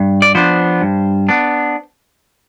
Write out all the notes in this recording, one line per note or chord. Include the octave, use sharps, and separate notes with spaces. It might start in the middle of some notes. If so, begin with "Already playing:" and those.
Already playing: G2
D5
F3 B3 D4 C5
G2
B3 D4